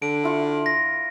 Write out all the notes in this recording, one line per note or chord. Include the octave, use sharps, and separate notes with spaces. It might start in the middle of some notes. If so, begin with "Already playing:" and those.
D3 D7
E4 F4 C#6
A#6